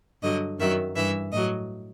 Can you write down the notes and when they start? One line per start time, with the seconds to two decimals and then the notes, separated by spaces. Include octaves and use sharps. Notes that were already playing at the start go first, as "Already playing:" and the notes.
0.22 G2 D3 F#3 D#5
0.59 F#2 D#3 F#3 E5
0.95 G2 E3 E5
1.32 A2 F#3 D#5